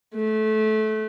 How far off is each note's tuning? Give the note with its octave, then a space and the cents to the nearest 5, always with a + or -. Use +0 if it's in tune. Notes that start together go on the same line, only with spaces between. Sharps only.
A3 -20